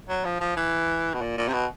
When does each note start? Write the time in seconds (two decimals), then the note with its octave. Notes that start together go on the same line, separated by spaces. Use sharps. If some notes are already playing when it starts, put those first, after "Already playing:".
0.09 F#3
0.25 F3
0.40 F3
0.56 E3
1.13 B2
1.21 A#2
1.37 A#2
1.48 C3
1.53 B2